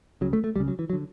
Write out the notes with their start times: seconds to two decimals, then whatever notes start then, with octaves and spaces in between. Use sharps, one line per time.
0.21 C#2 C#3 F#3
0.33 A3
0.44 A3
0.56 C#2 C#3 G3
0.68 F#3
0.79 E3
0.90 F#3
0.93 D3